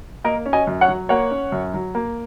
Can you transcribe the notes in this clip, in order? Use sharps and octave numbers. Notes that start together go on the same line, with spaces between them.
A#3 A#4 D#5
C#4
D#5 G#5
F#2
C#5 F#5
F#3
A#3 C#5 F#5
C#4
F#2
F#3
A#3